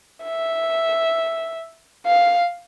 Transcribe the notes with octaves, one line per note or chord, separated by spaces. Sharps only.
E5
F5